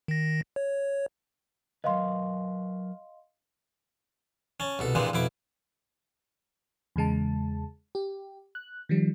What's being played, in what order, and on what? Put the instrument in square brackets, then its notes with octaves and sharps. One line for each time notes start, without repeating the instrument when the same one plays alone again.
[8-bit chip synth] D#3 A#6
C#5
[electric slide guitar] F#3 A#4 B4 [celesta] D#5 F5 C6
[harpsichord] C#4 A5
C2 B2 A4
G2 A#2 E3 G#3 C4 D4
F2 B2 E4 D6
[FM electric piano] E2 C#3 G#3 A5
G4
F#6
D#3 F3 G3